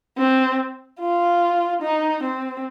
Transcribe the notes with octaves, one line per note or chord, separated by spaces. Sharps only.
C4
F4
D#4
C4